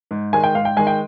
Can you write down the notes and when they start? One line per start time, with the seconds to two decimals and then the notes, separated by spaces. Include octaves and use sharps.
0.11 G#2
0.33 D#3 G#3 G#5
0.44 G5
0.55 G#2 F5
0.65 G5
0.77 D#3 G#3 G#5
0.87 G5